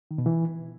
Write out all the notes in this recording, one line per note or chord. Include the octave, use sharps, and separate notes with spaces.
D#3
B2
E3